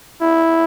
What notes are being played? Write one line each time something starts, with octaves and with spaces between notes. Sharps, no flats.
E4